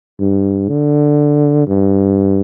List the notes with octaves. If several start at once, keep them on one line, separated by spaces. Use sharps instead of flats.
G2
D3
G2